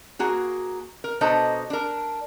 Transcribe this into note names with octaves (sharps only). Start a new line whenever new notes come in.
A#3 F#4 G#4
A#4
B2 D4 A4 C5 D#5 A#5
D4 A#4